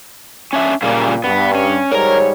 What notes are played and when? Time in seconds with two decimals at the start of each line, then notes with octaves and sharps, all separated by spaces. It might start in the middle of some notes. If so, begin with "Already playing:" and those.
0.53 C#4 D4 E5
0.83 A#2 C#3 G3 A#3
1.24 G2 B3
1.55 C#4
1.92 G#2 G3 A#4 C#5 A#5